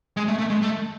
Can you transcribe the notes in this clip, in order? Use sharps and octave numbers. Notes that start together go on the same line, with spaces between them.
G#3
A3
A3
G#3
A3